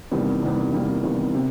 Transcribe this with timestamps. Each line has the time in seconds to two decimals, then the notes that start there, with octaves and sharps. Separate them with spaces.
0.11 E2 C3 D#3 G3 A#3
0.42 E2 C3 D#3 G3 A#3
0.72 E2 C3 D#3 G3 A#3
1.03 E2 C3 D#3 G3 A#3
1.35 C3